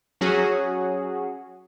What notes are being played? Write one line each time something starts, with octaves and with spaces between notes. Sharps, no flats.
F#3 C#4 F#4 G#4